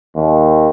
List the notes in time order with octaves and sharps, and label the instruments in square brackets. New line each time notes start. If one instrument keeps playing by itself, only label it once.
[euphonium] D#2